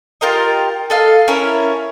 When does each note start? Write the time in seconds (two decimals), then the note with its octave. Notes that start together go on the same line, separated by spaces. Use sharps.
0.21 F4 G4 A#4 D#5
0.90 A4 D#5 F5
1.28 C#4 E4 A#4 C#5